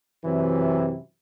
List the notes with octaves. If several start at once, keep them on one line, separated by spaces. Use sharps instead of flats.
F#2 C3 E3